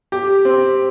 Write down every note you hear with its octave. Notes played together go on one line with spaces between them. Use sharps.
G4
C4